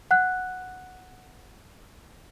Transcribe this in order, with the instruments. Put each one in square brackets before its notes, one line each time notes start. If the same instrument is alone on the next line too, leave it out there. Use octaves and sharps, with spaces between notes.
[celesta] F#5 F#6